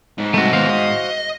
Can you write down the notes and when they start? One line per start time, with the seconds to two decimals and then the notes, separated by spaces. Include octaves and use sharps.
0.18 G#2
0.34 G3 A3 C4 F#4
0.53 D#3 B3 F#4 C5 F5
0.70 D#5